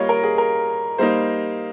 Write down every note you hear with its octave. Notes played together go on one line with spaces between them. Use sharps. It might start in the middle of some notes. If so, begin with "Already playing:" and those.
Already playing: G3 A#3 F4 C#5 D#5
A#4
G#4
A#4
G3 A#3 D#4 C5